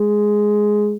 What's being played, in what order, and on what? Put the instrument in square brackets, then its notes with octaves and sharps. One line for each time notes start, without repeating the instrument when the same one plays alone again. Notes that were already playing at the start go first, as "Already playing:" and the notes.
Already playing: [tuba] G#3